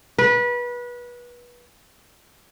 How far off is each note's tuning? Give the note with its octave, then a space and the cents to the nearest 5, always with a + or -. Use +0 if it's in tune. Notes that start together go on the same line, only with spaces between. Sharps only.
B4 -25